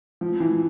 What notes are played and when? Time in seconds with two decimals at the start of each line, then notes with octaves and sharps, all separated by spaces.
0.21 F3
0.40 E3